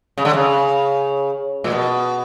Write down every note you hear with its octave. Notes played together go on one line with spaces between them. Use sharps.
C#3
D3
C#3
A#2
B2